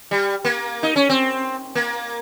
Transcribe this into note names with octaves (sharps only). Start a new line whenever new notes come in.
G3
A#3
D#4
C#4
C4
A#3